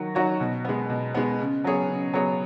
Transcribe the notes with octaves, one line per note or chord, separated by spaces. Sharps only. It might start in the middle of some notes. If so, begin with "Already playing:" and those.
Already playing: D#3 F#3 D#4 F#4
F#3 D#4 F#4 C#5
B2
G#3 B3
B2
G#3 B3
C#3
F#3 B3 G#4 C#5
C#3
F#3 B3 G#4 C#5